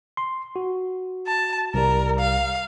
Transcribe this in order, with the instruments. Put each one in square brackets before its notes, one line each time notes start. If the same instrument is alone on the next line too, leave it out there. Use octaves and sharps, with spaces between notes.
[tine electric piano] C6
F#4
[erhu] A5
[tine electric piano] C2 G3 [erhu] A#4
[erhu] F5